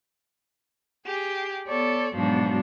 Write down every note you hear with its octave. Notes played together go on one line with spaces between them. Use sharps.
G4 G#4
B3 A4 C#5 D5
G#2 B2 F3 F#3 D4